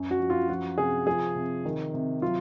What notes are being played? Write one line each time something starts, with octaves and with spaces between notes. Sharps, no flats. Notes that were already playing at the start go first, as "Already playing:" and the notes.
Already playing: F#2
F#4
F3
F4
F3 F#4
C3 G#4
F3 G#4
C3
D#3
C3
F#3 F4